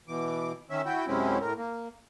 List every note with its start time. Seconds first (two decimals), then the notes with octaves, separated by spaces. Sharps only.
0.08 B2 E3 D6
0.70 D#3 C#4 E5
0.85 E4 F#4 G5
1.08 F#2 C3 G#3 C4 C#4 E4
1.41 A2 A#4
1.57 A#3